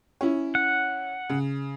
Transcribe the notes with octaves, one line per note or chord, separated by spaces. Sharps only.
C#4 E4
F#5
C#3